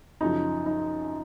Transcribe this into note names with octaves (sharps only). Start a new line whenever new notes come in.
F#2 C#3 F3 D#4
D#4